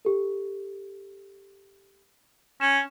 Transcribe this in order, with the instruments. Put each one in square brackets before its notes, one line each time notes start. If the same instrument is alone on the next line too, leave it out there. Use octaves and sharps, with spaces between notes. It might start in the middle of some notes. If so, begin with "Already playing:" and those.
[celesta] G4 A4
[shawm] C#4 [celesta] E7